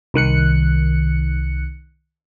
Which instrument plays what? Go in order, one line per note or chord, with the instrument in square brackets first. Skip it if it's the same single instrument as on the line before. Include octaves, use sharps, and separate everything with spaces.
[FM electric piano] C2 D#3 F#6 C#7